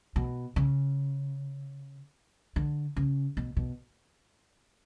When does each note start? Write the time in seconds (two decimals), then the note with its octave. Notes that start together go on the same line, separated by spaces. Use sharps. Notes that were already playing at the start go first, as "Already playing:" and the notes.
0.16 B2
0.56 C#3
2.56 D3
2.96 C#3
3.37 B2
3.57 B2